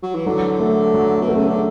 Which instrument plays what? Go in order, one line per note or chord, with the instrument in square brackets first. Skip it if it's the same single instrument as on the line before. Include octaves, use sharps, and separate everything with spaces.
[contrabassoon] F#3
E3
[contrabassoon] D3 [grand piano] F#3
[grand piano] A3
F#3
[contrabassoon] B2
[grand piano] A3
[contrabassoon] C#3
D3